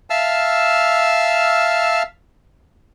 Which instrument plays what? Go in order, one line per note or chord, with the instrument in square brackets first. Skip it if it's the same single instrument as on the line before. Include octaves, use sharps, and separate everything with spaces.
[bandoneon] E5 F5 A5 E6 F6